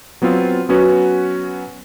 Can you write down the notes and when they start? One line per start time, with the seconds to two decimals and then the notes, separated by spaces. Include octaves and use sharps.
0.22 F#3 B3 C4 F4
0.69 F#3 B3 C#4 F#4 B4